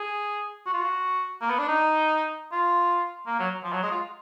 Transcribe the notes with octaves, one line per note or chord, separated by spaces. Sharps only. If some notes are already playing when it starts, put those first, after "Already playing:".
Already playing: G#4
F#4
F4
F#4
A#3
B3
D4
D#4
F4
A#3
F#3
F3
F#3
G#3
F4